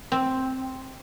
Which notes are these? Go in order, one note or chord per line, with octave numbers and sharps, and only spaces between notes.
C4